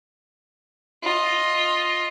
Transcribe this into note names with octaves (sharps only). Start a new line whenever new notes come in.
F4 D#5